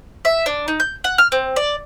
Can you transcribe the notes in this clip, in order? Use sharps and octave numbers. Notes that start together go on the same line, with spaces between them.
E5
D4
D#4
G6
F#5
F6
C4
D5